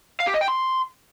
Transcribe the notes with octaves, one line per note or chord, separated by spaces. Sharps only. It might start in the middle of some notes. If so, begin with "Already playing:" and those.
F5
G4
D#5
G5
C6